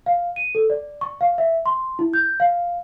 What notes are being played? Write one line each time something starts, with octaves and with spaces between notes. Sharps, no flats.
F5
D#7
A4
D5
C#6
F5
E5
C6
E4
G6
F5